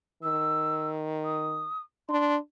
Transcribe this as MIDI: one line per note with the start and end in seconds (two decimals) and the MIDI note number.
0.23 1.68 51
0.23 0.88 88
1.24 1.79 87
2.09 2.37 62
2.09 2.36 84